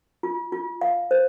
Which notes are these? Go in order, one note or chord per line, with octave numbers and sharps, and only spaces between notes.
F4
F4
F5
C5